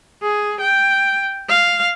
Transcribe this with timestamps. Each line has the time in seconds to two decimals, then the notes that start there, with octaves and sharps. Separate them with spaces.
0.23 G#4
0.61 G5
1.49 F5